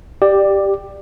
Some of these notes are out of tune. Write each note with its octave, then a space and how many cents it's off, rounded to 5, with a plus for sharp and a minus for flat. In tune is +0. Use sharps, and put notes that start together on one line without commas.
G4 +0 D5 +15